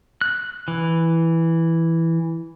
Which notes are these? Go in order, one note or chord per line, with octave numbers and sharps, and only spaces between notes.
F#6
E3